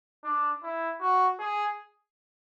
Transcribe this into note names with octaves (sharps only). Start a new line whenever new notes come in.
D4
E4
F#4
G#4